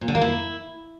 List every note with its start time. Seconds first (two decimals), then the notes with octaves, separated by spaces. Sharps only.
0.01 A#2
0.08 D3
0.15 A#3
0.21 E4